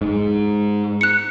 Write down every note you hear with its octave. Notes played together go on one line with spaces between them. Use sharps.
G#2
F#6 C#7